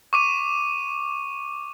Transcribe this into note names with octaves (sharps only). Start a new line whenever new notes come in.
C#6 D6 D#7